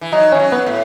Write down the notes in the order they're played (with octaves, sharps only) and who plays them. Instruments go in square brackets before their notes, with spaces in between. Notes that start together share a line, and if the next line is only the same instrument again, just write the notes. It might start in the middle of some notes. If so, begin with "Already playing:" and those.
[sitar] E3
[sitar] F#3 [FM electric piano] D#4
[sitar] E3 [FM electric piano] C#4
[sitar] F#3
[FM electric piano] B3
[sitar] A2